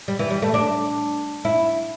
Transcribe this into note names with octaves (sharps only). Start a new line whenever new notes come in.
G3
E3
G3
A3
D4
E4